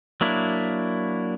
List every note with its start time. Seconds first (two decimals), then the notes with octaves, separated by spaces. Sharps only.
0.21 F#3 A#3 D4 E4